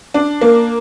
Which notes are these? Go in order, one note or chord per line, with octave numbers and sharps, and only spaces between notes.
D4
A#3